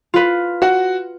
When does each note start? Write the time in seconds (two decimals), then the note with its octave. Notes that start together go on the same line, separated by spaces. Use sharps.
0.14 F4 B4
0.62 F#4 F#5